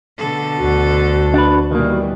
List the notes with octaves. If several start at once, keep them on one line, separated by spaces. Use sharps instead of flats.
B2 D3 A4
D2 F#4
D4 B4
B2 D#3 E3 G3 A#3